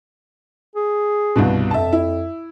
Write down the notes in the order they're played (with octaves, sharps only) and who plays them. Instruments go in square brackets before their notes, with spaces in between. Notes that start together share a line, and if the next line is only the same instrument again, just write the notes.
[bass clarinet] G#4
[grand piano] C2 G2 B2
[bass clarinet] F2 [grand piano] E5 A5
[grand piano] E4